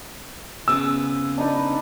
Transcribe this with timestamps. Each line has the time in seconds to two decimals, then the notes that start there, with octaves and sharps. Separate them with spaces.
0.68 C#3 B3 C4 E6
1.38 D4 D#4 B4